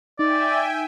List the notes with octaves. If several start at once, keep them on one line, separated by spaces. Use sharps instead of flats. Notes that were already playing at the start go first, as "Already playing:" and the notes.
D#4 D5 E5 G5 G#5